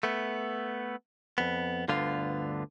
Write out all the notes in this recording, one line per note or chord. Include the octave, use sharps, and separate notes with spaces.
A3 B3
F2 B3
D2 G2 D3 B3 F4 F5